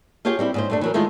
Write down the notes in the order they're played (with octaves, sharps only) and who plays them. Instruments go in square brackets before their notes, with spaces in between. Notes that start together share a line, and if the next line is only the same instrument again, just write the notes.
[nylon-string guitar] F4 G4 G#4 C#5 F5 G5
G3 C4 E4
G#2 C#4 C5
G2 A3 D4
E3 F#3 A#4
D#3 G#3 A3 E4 F4